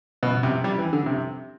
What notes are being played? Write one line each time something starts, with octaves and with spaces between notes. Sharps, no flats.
B2
C3
G3
E3
D3
C3